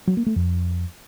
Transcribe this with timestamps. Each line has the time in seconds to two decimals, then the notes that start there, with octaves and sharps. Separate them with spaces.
0.07 F#3
0.17 A#3
0.26 A3
0.36 F2